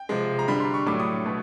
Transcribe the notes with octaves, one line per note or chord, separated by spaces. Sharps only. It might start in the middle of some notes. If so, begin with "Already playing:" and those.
Already playing: G5
C3 F3 G#3
A#5
D3 G3 B5
C6
C#6
A2 F#3 A3 D6
D#6
B2 F#3 A3